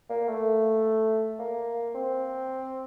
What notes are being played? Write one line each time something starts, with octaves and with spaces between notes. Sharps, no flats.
A#3
A3
A#3
C4